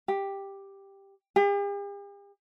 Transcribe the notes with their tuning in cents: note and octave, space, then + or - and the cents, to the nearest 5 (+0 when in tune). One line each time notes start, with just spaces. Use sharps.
G4 +5
G4 +45